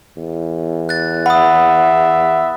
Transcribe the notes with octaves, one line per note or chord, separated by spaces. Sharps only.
E2
F#6 A6
E5 F#5 B5 D#6